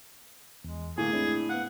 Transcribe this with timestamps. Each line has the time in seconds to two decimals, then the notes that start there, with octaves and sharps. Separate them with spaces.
0.64 E2 G#3
0.98 A2 D3 A#3 G#4 A4 G#5
1.13 G#3 C4 D4 E4
1.50 B3 F5 F#5